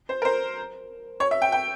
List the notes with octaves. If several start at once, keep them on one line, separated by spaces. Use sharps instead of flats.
C5
A#4
C5
C#5
E5
G5
G5